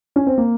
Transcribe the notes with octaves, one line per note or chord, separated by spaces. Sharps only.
C#4
C4
A#3